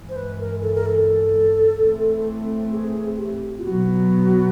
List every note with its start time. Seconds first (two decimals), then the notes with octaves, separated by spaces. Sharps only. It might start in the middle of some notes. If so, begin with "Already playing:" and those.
Already playing: G2 E3 G#3
0.09 C5
0.16 B4
0.39 A#4
0.62 A4
0.74 A#4
0.86 A4
1.78 A2 E3 A3 C4
2.72 G#4
3.18 G4
3.58 F4
3.64 B2 F#3 B3 F#4